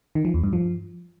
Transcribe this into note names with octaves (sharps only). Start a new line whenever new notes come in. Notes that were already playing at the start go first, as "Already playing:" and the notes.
D#3
F3
E2
G2
F3